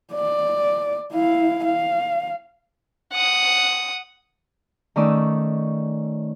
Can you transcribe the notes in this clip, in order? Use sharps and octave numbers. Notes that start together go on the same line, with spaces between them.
D5
E4 F5
F5
F#5 D#6
D#3 A3 C#4 D5 D#6 E6